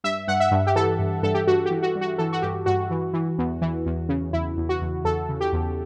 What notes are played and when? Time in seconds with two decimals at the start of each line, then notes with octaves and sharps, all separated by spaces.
0.04 G2 E5
0.28 G2 F#5
0.40 E5
0.51 G2
0.67 G4
0.75 E3 A4
0.99 G2
1.23 G2 A4
1.34 G4
1.47 G2 F#4
1.66 G4
1.71 E3
1.82 F#4
1.95 G2
2.01 F#4
2.18 E3 A4
2.33 F#4
2.42 G2 G4
2.66 G2 F#4
2.91 E3
3.13 E3
3.38 E2
3.61 E3
3.86 E2
4.09 C#3
4.33 E2 E4
4.57 E2
4.69 F#4
4.81 E2
5.04 E2 A4
5.29 C#3
5.41 G4
5.53 E2